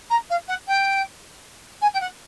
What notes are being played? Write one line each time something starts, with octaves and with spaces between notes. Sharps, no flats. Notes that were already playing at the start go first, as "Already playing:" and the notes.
A#5
F5
F#5
G5
G#5
G5
F#5